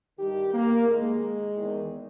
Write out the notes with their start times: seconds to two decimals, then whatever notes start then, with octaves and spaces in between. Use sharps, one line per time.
0.18 G2 D#3 G4
0.53 A#3
0.87 G#2 D#3 G#3
1.55 E2 D#3